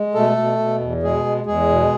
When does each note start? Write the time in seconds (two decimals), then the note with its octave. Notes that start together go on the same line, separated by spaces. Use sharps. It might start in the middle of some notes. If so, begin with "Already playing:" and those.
Already playing: G#3
0.14 B2 A3 A4
0.37 B2
0.59 B2
0.80 E2
1.03 B2 G#3 G#4
1.25 G#3
1.46 E2 G#3 G#4
1.69 B2